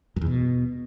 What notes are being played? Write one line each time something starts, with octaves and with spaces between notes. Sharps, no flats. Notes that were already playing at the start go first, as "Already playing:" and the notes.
F#2
E2
B2